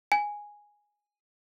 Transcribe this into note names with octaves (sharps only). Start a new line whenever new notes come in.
G#5